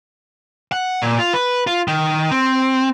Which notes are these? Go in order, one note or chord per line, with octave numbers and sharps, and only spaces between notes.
F#5
A#2
F4
B4
F4
D#3
C4